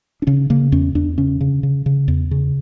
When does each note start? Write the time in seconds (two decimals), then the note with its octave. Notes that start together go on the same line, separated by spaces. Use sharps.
0.22 D4
0.27 C#3 C#4
0.50 C#3 A#3
0.72 E2 C#4
0.95 E2 D4
1.18 C#3 C#4
1.41 C#3
1.63 C#3
1.86 C#3
2.08 E2
2.31 C#3